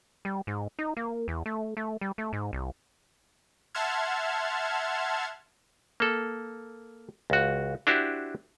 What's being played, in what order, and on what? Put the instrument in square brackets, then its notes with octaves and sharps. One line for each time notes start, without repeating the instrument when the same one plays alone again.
[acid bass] G3
G#2
D#4
A#3
E2
A3
A3
G3
A3
G#2
C2
[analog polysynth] E5 F#5 A5 C6 F6 G#6
[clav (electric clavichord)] A#3 A4
C#2 F#4
D4 E4 F#4 G4 C5